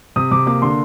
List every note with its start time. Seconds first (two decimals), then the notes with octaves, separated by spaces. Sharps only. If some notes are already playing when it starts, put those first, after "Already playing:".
0.16 C3 D#6
0.31 C3 D6
0.46 A#3 D6
0.62 D3 C6